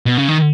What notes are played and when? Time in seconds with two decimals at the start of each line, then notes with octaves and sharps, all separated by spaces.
0.06 B2
0.18 C#3
0.28 D#3